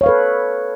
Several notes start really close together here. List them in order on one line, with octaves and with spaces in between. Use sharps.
C#5 F5 B4 A4